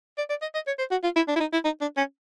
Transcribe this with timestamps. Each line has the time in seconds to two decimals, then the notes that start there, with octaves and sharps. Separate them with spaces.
0.18 D5
0.29 D5
0.42 D#5
0.54 D#5
0.67 C#5
0.79 C5
0.91 F#4
1.03 F4
1.16 E4
1.28 D4
1.36 E4
1.40 D#4
1.53 E4
1.65 D#4
1.81 D4
1.97 C#4